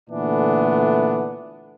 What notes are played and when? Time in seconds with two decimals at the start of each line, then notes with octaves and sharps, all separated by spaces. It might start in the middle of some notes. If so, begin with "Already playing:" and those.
0.10 A#2 D3 E3 A3 B3 D4